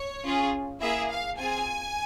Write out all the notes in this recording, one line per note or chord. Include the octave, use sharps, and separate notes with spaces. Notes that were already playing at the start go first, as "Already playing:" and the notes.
Already playing: C#5
C#4 F4 G#4
A#3 E4 G#4 E5
F5
C4 F4 G#4 G#5